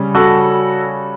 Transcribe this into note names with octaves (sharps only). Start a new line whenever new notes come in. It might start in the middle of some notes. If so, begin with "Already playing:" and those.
Already playing: C#3 G3 C#4
F#4 A4